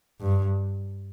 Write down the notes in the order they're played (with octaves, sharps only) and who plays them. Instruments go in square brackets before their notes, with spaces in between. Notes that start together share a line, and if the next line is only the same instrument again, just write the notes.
[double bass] G2